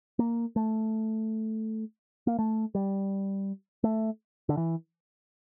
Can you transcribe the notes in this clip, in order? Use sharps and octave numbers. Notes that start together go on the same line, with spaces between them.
A#3
A3
A#3
A3
G3
A3
D3
E3